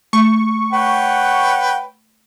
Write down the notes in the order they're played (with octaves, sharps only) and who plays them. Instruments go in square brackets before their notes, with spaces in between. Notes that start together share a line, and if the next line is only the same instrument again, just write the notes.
[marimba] A3 [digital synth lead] C#6
[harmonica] B4 C#5 G5 [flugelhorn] F#5